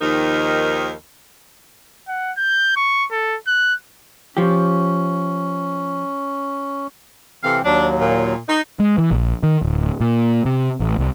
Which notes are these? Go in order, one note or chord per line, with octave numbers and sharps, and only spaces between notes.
D#2 D#3 F3 D#4 A#4
F#5
G6
C#6
A4
F#6
F3 C#4 G4
C3 E3 C4 A4 F5
D#2 F#3 D4
A#2
D#4
G#3
E3
A#1
D#3
D1
A#2
C3
A1
C2